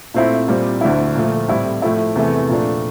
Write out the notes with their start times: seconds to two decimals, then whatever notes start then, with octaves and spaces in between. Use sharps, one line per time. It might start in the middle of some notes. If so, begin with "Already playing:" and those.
0.14 A#2 A3 C4 E4
0.48 A#2 G3 C4
0.81 D2 D3 A3 E4
1.15 A#2 F3 A3
1.48 A2 G3 C4 E4
1.82 A2 F3 A3 E4
2.16 E2 C3 E3 A3
2.49 A#2 F3 A3 D4